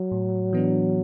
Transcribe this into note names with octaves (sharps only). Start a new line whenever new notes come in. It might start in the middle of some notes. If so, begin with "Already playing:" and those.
Already playing: F#3
A2
E3 B3 D4